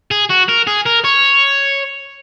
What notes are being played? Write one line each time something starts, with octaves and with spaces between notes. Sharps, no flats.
G#4
F#4
A#4
G#4
A#4
C#5